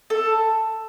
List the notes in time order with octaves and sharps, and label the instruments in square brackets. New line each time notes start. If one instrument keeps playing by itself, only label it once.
[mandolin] A4